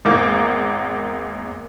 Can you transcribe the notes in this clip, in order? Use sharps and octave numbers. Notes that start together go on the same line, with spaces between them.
G#1 E2 A#3 D6